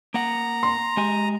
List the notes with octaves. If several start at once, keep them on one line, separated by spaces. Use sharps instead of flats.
A#3 F#5 A#5
C6
G#3 G4 G#5